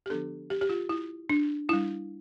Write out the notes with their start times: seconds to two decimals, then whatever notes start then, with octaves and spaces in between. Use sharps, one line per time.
0.06 G4
0.10 D3 F3 B3 D4 A4
0.50 G4
0.61 G4
0.69 F4
0.89 E4
1.29 D4
1.69 G3 D4 E4